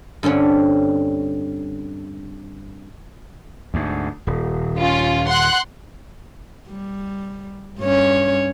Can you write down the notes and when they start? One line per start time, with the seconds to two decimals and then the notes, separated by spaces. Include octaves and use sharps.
0.23 G2 D3 C4 C#4
3.74 D2 G#2
4.27 D#1
4.77 C#4 F4
5.27 F#5 C6 F#6
6.68 G3
7.80 G2 C#4 C#5